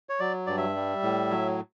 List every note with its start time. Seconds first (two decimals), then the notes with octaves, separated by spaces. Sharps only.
0.09 C#5
0.20 F#3 D5
0.47 G2 D5
0.57 E5
0.76 G3
1.03 A2
1.31 F#3